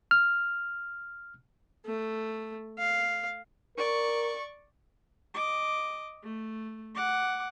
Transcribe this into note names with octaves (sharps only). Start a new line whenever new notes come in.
F6
A3
F5
A#4 D5 C#6
D#5 D6
A3
F#5 D6